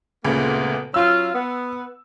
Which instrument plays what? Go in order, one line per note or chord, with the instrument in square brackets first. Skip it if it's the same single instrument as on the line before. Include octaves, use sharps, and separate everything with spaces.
[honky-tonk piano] D2 A#2 C#3 [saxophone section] G#3 A#3 B3
[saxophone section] F#3 C#4 F4 [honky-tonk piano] E6
[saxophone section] B3